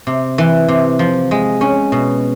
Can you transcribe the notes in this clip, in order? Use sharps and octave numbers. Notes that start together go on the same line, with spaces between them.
C3
E3
C3
F3
G#3
C#4
B2